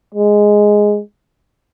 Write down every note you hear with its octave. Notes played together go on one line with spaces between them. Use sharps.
G#3